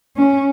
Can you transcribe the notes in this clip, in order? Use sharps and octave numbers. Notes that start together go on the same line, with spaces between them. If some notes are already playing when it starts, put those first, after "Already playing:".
C#4